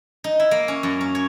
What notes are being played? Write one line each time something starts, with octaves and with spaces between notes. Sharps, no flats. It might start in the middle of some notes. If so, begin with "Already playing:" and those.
D#4
E4
A#3
C#4
F#2
C#4
C#5